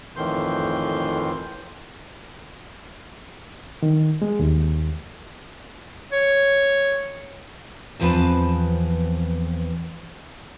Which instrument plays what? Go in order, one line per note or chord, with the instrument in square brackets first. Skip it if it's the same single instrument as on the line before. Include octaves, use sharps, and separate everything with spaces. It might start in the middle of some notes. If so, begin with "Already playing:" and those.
[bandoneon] F2 A2 D#3 E3 C6 G6
[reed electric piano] D#3
G#3
D#2
[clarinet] C#5
[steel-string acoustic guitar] E2 F3 C4 B4 A5